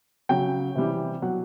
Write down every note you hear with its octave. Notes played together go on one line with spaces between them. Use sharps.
C#3 F#3 G5
C3 E3 G3
B2 F#3 F#5